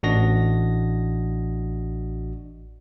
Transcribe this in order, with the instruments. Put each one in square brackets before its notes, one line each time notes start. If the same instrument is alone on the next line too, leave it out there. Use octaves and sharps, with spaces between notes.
[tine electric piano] A1 D4 F#4 D#5 A#6